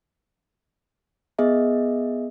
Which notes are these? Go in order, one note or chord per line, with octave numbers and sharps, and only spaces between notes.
B3 G#4 D#5 E5